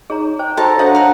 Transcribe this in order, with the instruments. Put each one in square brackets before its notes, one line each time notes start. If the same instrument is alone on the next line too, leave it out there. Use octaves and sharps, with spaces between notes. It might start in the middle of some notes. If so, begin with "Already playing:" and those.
[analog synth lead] D#4 [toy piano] G#4 C#5 A#5
[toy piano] C5 [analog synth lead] G5
[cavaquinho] D#4 C#5 A5 [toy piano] F#4 [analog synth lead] A4 [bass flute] C5
[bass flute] D4 [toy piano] C#5 F5 [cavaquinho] D#5 A#5 [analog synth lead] F#5
[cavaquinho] A#4 B4